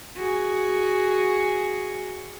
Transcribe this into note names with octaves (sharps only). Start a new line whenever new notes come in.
F#4 G#4